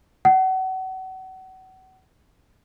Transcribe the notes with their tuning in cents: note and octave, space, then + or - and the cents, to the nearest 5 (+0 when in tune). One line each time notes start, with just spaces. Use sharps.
F#5 +35